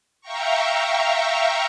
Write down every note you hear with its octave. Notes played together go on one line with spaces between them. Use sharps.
E5 F5 G5 A#5 C#6